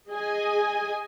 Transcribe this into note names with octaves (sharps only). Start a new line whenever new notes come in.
G#4 D#5 G#5